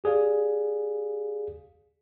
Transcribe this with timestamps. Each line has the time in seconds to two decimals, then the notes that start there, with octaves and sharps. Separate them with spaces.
0.04 G4 G#4 D5 F5